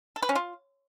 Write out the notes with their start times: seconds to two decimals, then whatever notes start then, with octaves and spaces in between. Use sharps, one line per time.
0.16 A4
0.22 B4
0.29 C#4
0.35 F4